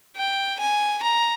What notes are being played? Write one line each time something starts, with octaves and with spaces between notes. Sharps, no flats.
G5
G#5
A#5